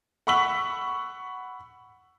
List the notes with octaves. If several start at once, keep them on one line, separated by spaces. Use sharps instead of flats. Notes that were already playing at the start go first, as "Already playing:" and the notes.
F#5 B5 C#6 E6 B6 F#7